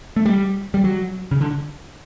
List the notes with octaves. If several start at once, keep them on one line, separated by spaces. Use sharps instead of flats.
A3
G3
G3
F#3
C#3
D3